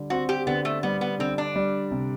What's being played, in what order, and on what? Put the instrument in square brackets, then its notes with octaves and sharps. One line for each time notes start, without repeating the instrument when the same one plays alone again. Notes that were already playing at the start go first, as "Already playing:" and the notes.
Already playing: [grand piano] D3 G3
[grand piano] C4 [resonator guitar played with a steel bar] F#4
[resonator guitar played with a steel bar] G4
[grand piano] D3 [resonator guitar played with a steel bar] B3
[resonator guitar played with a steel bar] A3
[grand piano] G3 [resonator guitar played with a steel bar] B3
[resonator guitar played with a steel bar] B3
[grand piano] D3 [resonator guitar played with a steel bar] C4
[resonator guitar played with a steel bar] D4
[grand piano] G3
C3